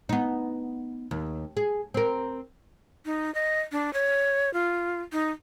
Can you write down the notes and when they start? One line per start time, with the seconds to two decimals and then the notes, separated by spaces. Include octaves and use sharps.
0.09 B3 D#4
1.11 D#2
1.57 G#4
1.94 C4 A#4
3.06 D#4
3.35 D#5
3.72 D4
3.93 C#5
4.54 F4
5.12 D#4